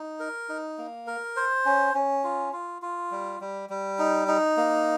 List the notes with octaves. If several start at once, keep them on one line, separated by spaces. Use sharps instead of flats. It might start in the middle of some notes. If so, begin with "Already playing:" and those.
Already playing: D#4
A#4
D#4
A#3
A#4
C5
C#4
C#4
F4
F4
F4
G3
G3
G3
D#4
D#4
A#3